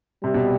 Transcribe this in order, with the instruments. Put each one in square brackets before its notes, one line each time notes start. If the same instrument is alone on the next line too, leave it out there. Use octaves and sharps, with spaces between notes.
[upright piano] C3 [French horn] G3
[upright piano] B2